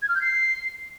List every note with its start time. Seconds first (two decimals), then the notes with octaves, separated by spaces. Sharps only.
0.02 G#6
0.09 F6
0.15 G6
0.21 C7